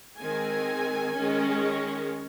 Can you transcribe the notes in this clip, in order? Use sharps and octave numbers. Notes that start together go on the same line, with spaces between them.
D#3 G#3 C4 G#5
D#3 G#3 C#4